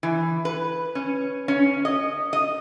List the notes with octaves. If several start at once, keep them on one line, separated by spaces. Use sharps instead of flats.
E3
B4
C#4
C#4
D#5
D#5